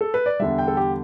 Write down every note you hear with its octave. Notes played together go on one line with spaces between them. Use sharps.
A4
B4
D5
E2 D3 G3 E5
G5
A4
G4